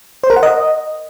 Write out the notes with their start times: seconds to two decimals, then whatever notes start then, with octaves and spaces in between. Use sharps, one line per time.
0.24 C5
0.30 A#4
0.36 F#5
0.43 D#5